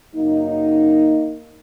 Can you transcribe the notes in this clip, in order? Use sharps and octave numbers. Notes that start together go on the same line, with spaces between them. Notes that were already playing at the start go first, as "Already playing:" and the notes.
F#2 C#3 F#3 A#3 D#4